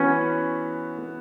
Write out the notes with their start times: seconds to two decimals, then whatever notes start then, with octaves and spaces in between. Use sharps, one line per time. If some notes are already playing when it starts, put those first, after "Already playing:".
Already playing: E3 B3 C#4 F#4